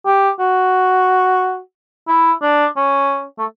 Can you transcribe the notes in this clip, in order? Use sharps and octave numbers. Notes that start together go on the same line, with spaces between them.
G4
F#4
E4
D4
C#4
A3